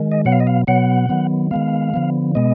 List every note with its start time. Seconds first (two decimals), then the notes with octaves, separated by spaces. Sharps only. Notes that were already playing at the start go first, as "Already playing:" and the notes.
Already playing: D#3 G#3
0.12 D#5
0.25 B2 F#3 B3 F#5
0.32 F5
0.40 D#5
0.47 F5
0.67 B2 F#3 B3 F#5
1.09 D#3 F#3 B3
1.51 D#3 G#3 B3 F5
1.94 D3 F3 B3
2.35 B2 G#3 B3 D#5